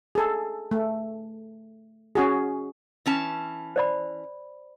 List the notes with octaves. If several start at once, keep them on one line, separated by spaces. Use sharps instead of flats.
G#4 A4
A3
C#4 F#4 G#4
E3 C#4 A5
C5 D5 B5